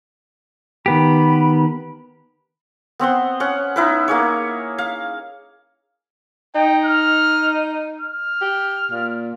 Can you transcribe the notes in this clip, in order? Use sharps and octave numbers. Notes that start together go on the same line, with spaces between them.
D#3 B3 G4 B5
B3 C4 F#5 C6
C#4 F#5
D#4 E4 B4
A#3 G#4 C#5
F5
D#4 G5
F6
F6
G4
A#2